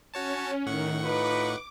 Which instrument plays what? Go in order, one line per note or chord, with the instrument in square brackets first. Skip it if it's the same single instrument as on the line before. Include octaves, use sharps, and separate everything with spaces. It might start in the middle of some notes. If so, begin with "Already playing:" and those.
[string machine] C#4 [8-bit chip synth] F#4 C#5 A5
[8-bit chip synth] A2 F#5 C#6 [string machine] D#3
[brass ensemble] D#4 F4 B4 [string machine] D6